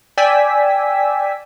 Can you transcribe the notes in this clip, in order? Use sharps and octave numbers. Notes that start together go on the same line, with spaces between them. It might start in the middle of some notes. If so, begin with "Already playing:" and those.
D5 G5 G#5 E6 B6